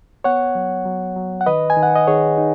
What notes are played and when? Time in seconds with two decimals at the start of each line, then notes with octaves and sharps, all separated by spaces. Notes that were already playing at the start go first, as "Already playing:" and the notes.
0.24 B3 C#5 F#5
0.55 F#3
0.85 F#3
1.16 F#3
1.41 F#5
1.46 D#3 B4 D#5
1.70 G#5
1.77 D#3
1.83 F#5
1.96 D#5
2.07 D#3 G#4 C#5
2.38 D#4